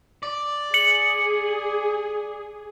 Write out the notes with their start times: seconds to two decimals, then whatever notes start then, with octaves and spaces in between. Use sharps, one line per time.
0.23 D5
0.74 G#4 C#7 F#7